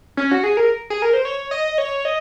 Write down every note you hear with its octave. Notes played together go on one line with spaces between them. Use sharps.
C#4
F#4
G#4
A#4
G#4
A#4
C5
C#5
D#5
C#5
D#5